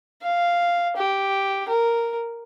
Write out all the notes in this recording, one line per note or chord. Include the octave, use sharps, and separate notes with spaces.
F5
G4
A#4